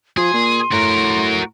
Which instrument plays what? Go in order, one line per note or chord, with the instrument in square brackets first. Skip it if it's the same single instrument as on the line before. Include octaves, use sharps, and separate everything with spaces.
[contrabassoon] F3 [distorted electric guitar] G#4 [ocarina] C6
[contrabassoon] A#2
[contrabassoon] A2 [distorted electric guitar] F#4 A#4